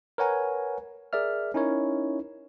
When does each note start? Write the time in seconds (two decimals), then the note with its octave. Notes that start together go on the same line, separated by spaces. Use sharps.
0.18 A#4 B4 C#5 F#5 G#5 A#5
1.13 G#4 A#4 D5 E5 F6
1.54 C#4 D#4 E4 A#4 C#5